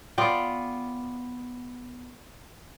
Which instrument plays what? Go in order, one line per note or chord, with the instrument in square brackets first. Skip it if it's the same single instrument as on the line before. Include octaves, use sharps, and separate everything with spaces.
[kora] B3 F4 D5 G5